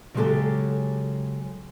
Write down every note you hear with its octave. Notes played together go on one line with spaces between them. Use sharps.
C#3 F#3 G#3 B3 G4 A4